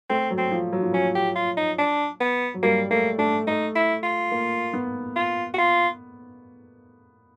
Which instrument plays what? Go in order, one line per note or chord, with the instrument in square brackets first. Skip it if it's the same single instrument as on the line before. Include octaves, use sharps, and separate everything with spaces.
[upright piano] A3 [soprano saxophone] C4
[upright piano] F#3
[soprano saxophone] C4
[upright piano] F3
F#3
F3
[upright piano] F#3 [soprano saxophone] C#4
[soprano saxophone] G4
F4
D#4
D4
B3
[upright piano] F#3
[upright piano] G3 [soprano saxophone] A#3
[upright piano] A3 [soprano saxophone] A#3
[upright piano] A3 [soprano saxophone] D4
[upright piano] A3 [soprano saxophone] D#4
[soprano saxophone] E4
F4
[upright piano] A#3
B3
[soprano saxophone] F4
F#4
F4